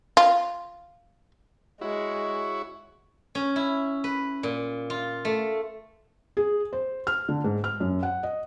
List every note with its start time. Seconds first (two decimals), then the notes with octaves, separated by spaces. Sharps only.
0.17 F4
1.81 G#3 E4 F#4 C#5
3.35 C#4
3.56 E4
4.04 B4
4.43 A#2
4.90 F4
5.25 A3
6.37 G#4
6.73 C5
7.07 F6
7.29 D3
7.44 G#2
7.64 F6
7.80 F#2
8.03 F#5
8.23 D#5